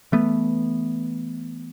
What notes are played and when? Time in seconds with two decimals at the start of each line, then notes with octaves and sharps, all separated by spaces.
0.12 E3 A3 B3